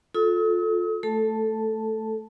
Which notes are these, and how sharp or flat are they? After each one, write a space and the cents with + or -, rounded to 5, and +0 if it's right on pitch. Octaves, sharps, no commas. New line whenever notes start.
F4 +25 A4 -5 D#6 +45
A3 +0 A4 +0 A5 +0